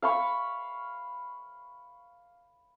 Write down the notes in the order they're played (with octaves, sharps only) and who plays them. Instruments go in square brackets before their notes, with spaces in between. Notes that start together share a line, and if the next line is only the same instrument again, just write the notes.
[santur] F5 B5 C#6